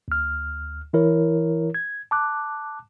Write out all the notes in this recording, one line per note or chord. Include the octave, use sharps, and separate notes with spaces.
D2 F6
E3 E4 A#4 C#5
G#6
A5 D6 F#6